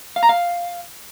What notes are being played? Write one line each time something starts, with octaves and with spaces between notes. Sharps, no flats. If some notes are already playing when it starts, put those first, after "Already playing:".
F5
A#5
F5